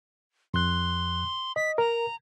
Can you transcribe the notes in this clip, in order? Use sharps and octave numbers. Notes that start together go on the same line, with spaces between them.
F2 C6 F#6
D#5 B6
A#4 A#5